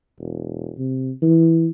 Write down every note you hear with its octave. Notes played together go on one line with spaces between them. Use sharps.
E1
C3
E3